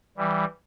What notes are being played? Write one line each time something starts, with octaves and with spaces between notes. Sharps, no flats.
E3 G3